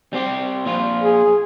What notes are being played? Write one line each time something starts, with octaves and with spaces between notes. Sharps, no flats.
G3 C4 G4
A#2 F3 F4
G#4